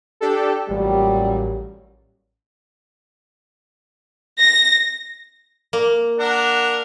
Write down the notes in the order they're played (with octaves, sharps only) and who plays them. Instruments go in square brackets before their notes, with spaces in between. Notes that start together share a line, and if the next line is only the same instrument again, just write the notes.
[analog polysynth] D4 G4 A4
[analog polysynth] A1 [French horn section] A#2 F#3 G3
[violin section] A#6
[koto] A#3
[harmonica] D4 A#4 F#5